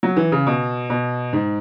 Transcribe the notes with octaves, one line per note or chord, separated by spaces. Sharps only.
F#3
E3
C#3
B2
B2
G#2